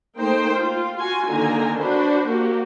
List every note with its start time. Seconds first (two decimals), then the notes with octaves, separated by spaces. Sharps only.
0.18 A3 A#3 D#4 C5 G5 C6
0.57 F4
0.98 F4 F#4 G#5
1.29 D3 D#3 A#3 G#5 A#5
1.79 D4 F#4 B4 C5
2.27 A#3 F#4 G4